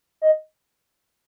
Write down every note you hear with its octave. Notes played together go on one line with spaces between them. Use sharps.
D#5